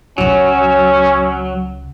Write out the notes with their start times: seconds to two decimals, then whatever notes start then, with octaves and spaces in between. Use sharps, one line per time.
0.18 C#2 C#3 F#3 C#4